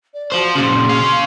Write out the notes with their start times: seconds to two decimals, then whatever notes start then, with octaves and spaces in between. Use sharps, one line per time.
0.14 D5
0.32 F4 F#4 C5
0.55 A#2 C#3 C6
0.89 C#4 F5